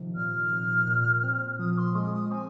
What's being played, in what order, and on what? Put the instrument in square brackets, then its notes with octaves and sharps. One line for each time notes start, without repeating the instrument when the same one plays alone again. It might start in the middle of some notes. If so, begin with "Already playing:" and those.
Already playing: [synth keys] C3 D#3 F3
[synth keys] A#2 [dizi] F6
[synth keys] C3
A#2
C4
[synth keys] F3 [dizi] D#6
[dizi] C6
[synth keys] G#3 [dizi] D#6
[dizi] D#6
[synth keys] C4 [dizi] G#5